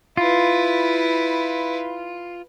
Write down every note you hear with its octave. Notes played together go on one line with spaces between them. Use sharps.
E4 F4 B4